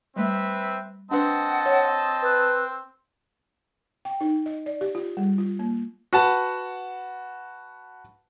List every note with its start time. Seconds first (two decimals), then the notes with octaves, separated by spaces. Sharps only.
0.16 G3 A3 C4 B4 E5
1.11 C4 D4 B4 D#5 F#5 A5
1.66 C#5
2.22 B4
4.05 G5
4.21 D#4
4.46 D#5
4.66 D5
4.81 G4
4.95 F4
5.17 G3
5.38 F4
5.59 A#3
6.13 F#4 B4 F#5 A5